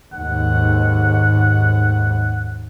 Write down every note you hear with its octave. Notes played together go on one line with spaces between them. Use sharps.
D#2 G#2 F#5